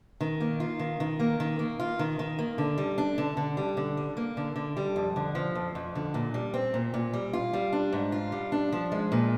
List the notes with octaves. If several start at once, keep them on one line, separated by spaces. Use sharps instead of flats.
D#3
A#3
F4
D#3
D#3
A#3
D#3
A#3
F4
D#3
D#3
A#3
D3
G3
D4
D3
D3
G3
D3
G3
A#3
D3
D3
G3
F2
D3
F3
F2
F2
D3
A#2
G3
C4
A#2
A#2
G3
F4
G3
D4
G#2
F4
G3
D4
F3
G#3
A#2